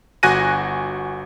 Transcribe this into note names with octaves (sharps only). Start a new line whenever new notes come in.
G1 F#4 G#5 F#6 A#6 D#7